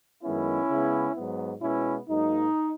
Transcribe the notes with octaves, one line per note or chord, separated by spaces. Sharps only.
F#2 D#3 G#3 B3 C#4 E4
C#3 G#3 B3
G#2 F#3 B3
B2 G#3 B3 C#4 E4
G#2 F#3 A#3 D#4